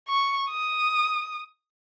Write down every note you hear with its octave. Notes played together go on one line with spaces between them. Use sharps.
C#6
D#6